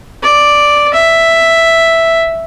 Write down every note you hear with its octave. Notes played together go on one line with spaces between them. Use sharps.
D5
E5